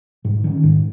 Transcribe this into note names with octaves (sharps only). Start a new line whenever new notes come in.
G#2
D#3 C#4
G#2